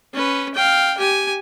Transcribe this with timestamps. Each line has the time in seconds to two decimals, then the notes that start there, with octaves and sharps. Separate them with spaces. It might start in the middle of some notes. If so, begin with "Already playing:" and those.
0.14 C#4 B4
0.55 F5 G5
0.98 G4 G#5